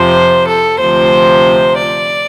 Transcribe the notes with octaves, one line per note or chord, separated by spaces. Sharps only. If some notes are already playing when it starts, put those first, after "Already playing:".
Already playing: F2 C3 F3 C5
A4
D2 C3 F3 C5
D5